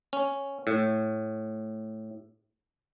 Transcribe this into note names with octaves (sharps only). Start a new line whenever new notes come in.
C#4
A2